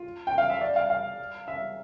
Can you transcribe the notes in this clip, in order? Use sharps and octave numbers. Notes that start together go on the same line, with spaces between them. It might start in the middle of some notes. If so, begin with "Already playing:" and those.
Already playing: F4
G5
F5
E5
D5
F5
F5
E5